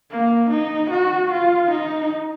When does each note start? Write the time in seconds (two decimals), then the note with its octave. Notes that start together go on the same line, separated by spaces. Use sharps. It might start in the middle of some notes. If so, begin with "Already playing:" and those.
0.11 A#3
0.50 D#4
0.91 F#4
1.31 F4
1.71 D#4